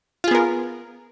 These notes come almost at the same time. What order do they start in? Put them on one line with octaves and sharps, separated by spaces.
F4 G#4 B3 A#4